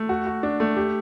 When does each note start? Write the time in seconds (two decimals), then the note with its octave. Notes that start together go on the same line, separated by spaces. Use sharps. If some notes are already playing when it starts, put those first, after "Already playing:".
Already playing: A3
0.09 F#4
0.26 F#4
0.43 D4
0.60 A3
0.77 G4